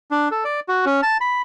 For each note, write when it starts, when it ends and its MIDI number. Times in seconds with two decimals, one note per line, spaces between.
0.11 0.29 62
0.31 0.44 69
0.45 0.60 74
0.69 0.85 66
0.86 1.01 61
1.03 1.17 81
1.21 1.42 83